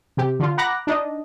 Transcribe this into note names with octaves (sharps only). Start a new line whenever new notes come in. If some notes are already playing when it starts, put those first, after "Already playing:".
C3 G4
D3 F4
F#5 A#5 B5 D6 F#6 A#6
D4 D#4 D#5